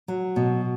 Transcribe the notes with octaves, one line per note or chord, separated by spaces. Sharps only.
F#3
B2